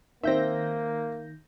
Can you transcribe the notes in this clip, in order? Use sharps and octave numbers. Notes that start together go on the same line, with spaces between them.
D#3 A#3 C4 E5 G6 A#6